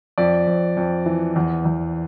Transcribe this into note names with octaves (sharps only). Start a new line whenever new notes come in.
F2 D5
F2
F2
E3
E2
E2